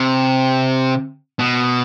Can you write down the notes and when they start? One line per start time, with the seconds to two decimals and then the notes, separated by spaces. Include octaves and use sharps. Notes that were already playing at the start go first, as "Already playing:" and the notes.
Already playing: C3
1.39 B2